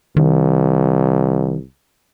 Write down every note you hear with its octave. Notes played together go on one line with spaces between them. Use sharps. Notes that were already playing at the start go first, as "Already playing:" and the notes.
C2 D#3